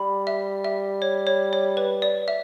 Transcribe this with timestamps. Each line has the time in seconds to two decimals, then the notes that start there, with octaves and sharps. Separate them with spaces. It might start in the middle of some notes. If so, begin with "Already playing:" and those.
Already playing: G3 B5
0.27 E5
0.64 E5
1.02 C#5
1.27 C#5
1.53 C#5
1.77 B4
2.02 D5
2.28 E5